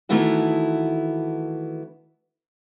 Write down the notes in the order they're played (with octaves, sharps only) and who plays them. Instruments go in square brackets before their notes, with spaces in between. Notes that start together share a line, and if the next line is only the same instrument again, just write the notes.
[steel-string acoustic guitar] D#3 E3 A3 B3 E4 F#4